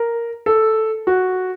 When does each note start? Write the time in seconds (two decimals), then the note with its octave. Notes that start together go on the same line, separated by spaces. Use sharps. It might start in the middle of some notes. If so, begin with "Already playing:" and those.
Already playing: A#4
0.46 A4
1.07 F#4